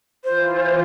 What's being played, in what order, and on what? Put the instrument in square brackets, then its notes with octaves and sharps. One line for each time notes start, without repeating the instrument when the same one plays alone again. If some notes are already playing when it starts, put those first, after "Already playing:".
[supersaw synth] E3 F4 [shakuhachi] C5